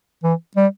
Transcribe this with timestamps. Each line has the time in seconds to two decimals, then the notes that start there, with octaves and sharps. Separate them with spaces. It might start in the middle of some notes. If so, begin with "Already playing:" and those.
0.24 E3
0.57 G3